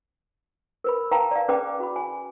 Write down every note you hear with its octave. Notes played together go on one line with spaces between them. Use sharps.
A#4 B4 B5
B4 F5 G5 A5 A#5
D5 F5
C#4 G#4 B4 G5 G#5 D6
F#4 B5
G#5